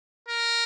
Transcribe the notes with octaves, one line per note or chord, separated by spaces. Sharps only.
A#4